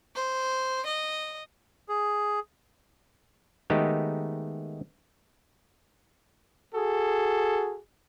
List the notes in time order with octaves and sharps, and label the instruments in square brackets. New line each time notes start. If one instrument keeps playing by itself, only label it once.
[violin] C5
D#5
[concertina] G#4
[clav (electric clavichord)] D#3 G#3 A3 B3 D#4 G4
[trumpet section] F#4 G#4 A4